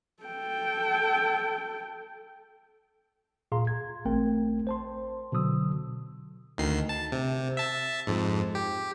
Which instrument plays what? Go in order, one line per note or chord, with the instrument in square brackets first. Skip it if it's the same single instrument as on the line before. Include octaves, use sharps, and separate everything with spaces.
[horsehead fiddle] A4 G5
[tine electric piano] A#2 G#4 F5 A#5 C6
G#6
A1 A3 C4 A#4 G5
C5 A5 C6
B2 D3 F#3 D#6 E6
[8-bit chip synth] D2 D#3 C7
A5
C3
E5 A5
F2 G#2
G4